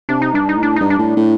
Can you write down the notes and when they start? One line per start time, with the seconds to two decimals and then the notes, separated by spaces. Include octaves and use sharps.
0.09 C3 D4
0.22 D#4
0.33 G2 D4
0.49 D#4
0.56 A2
0.63 D4
0.76 G2 D#4
0.90 D4
0.99 A2
1.17 A2